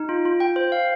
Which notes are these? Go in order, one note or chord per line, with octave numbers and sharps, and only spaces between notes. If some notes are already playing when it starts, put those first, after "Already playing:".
Already playing: D#4
F4
F4
G5
C5
F5